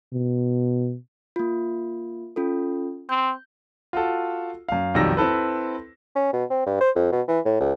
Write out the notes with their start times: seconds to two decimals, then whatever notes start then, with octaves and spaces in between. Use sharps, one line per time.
0.13 B2
1.36 A#3 F4
2.36 C#4 F4 A4
3.09 C4 G6
3.93 F4 F#4 A4
4.69 F#2 F5
4.94 B1 F2 D#3 G3 E6 A#6
5.17 C4 E4 A4 B4
6.16 C#4
6.33 B2
6.50 C4
6.66 G2
6.81 C5
6.96 F2
7.12 B2
7.28 E3
7.45 A2
7.60 C#2